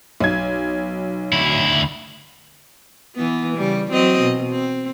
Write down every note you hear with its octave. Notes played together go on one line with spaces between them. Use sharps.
B1 G#6
D2 E4
E3 B3
C#3 G3
F#3 C4 D#5
B2
C4